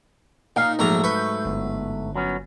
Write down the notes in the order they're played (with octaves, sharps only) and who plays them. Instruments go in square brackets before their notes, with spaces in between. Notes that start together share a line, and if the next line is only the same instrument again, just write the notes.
[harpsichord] A#2 [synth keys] D#4 [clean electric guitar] F5
[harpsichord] A#1 A#3 A#5 [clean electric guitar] G#2 F#3 A3
[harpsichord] B4 [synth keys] C#6 G6
[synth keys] G1
[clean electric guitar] F#3 B3 C#4